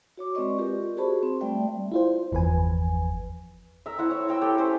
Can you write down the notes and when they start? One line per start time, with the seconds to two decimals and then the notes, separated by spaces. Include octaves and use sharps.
0.17 F#4 C#5 D6
0.35 G#3 C4 B4 D5 D#5 C#6
0.57 F4 G4 A#4
0.97 F#4 G#4 C5 A5 B5 C#6
1.23 C4
1.41 G3 A3 D5 E5 G5
1.92 E4 F4 C5
2.31 G1 E2 F3 B4 G#5
3.86 A#4 E5
3.98 C4 E4 F#5
4.11 C#5 E5
4.28 A#4 G5 E6
4.42 G4 A4 A#4
4.58 C#4 B4 C5